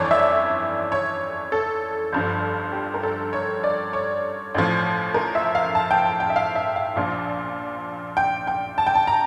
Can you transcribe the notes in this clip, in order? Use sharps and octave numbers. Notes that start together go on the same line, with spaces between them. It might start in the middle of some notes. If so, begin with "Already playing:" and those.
Already playing: G1 F2 E3 C#5 D5
E5
C#5
A4
G1 G2 D3 F3
G4
A#4
A4
C#5
D5
C#5
A1 A2 F3
A#4
E5
F5
A5
G5
A5
G5
E5
F5
E5
F5
A#1 A#2 F3
G5
G5
A5
G5
A5
A#5